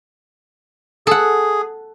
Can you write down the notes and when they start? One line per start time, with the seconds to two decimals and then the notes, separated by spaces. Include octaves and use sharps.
1.07 G#4 A4 F#5